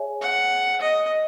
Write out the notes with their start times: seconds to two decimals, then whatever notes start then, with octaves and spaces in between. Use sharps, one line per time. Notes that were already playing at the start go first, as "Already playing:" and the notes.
Already playing: G#4 C#5 E5 G#5
0.21 F#5
0.81 D#5